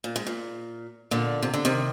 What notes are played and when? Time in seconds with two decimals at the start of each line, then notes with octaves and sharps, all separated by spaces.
0.04 A#2
0.16 G#2
0.27 A#2
1.11 A#2 D3
1.43 C3
1.54 D3
1.65 C3 D#3